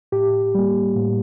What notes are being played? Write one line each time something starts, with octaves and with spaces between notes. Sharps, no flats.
A2 G4
G3 A#3
A2